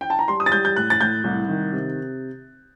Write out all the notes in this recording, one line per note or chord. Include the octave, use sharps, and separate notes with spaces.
G5
A5
A#5
G3 C6
D#6
A6
G3 G6
G6
A2 F#6
A6
A2 G6
C2
D#3
C3